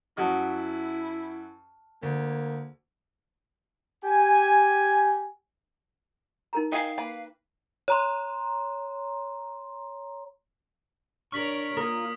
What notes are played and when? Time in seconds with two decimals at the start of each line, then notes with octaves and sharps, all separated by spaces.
0.17 F#2 E4 F#4 D#5 A5 F6
2.02 D2 A#3
4.04 G4 G#5
6.53 D#4 A#4 A#5
6.72 D#5 F5 G5 G#5
6.98 A#3 B4 B5
7.88 C#5 A#5 C6
11.32 D4 A#4 C#5 C#6 F6 B6 F#7
11.77 A#3 F4 A#4 D#6